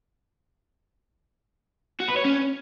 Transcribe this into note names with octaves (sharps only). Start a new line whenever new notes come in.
F#4
B4
C#5
C#4